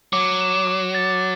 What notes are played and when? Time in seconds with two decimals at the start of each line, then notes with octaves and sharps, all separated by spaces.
0.13 F#3 D6
0.41 E7
0.67 D6
0.95 A6